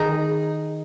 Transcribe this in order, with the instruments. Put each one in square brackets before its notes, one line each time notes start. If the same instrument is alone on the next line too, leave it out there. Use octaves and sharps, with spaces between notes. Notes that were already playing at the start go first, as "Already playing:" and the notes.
Already playing: [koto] D#3 D#4 [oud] G#4